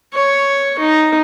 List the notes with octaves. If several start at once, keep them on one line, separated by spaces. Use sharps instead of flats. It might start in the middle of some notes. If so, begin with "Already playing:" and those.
C#5
D#4